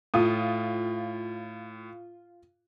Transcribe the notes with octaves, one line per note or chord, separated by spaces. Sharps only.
A2 F4 D#6